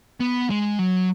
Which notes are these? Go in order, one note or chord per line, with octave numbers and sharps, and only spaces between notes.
B3
G#3
F#3